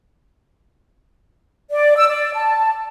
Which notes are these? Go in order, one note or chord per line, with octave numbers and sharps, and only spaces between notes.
D5
E6
D5
A5